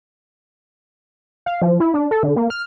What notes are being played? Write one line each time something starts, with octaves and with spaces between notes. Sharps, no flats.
F5
F3
E4
D4
A4
D3
A#3
F6